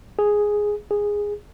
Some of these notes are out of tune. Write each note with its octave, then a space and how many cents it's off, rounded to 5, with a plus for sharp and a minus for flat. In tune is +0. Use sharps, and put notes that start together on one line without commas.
G#4 +0
G#4 -10